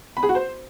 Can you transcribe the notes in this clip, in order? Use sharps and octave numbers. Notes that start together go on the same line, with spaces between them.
B5
G#4
F#4
C5